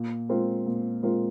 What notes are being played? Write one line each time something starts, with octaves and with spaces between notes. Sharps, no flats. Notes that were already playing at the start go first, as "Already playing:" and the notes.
Already playing: A#2
G#3 C4 F4 A#4
A#2
G#3 C4 F4 A#4